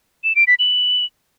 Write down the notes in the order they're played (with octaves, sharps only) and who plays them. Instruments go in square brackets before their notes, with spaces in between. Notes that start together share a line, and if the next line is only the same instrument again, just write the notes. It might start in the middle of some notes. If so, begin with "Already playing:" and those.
[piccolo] E7
D7
B6
F#7